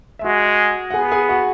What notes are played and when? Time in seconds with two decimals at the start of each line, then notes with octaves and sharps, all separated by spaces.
0.19 E5
0.24 G#3 F#4 F#5
0.91 F#5
0.94 B3 G#4 G#5
1.12 G#4 G#5
1.29 F#4 F#5